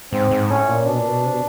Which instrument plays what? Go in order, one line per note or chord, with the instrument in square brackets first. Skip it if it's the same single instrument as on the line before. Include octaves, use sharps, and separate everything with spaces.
[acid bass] G#2 [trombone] C4
[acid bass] G#2
[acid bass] A2 [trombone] C#4
[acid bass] A#2
[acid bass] B2 [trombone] D4
[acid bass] A#2
B2
C3
B2